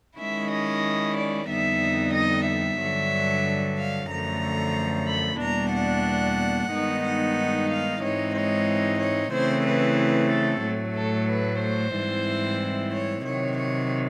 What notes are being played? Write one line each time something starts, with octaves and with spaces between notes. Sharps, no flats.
D#3 G#3 C#4 E4 E5
D#5
D5
F2 D3 G3 B3 D#4 E5
D#5
E5
G2 D3 F#3
F5
F#2 D3 F3 A3 A#5
B5
E2 B2 G3 A#3 D4 A#5
F#5
G2 D#3 G#3 B3 D#4
F#5
F5
G#2 E3 G#3 C4 D#4 C#5
C#5
C#5
C#3 E3 A3 C4 E4 C5
B4
A4
A2 F#3 A3
A4
B4
C5
G#2 E3 G3 C4 E4
C#5
C3 D#3 F#3 C#5
C#5